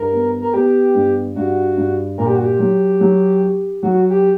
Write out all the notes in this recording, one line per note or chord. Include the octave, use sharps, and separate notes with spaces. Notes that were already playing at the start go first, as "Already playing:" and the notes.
Already playing: G2 A#4
B3
A#4
B3 G4
G2
G2 F#4
G2
A#2 A#4
G4
F#4
G4
F#3
F#3
G4
F#3 F#4
G4